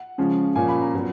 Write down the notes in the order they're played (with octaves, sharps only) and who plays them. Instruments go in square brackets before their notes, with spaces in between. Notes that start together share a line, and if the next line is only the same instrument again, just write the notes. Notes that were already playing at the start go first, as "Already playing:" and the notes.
Already playing: [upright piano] F#5
C#3 F3 G#3 C#4
A#2 F3 A#3 C#4 G#5
B5
A#5
A#2 F#3 B3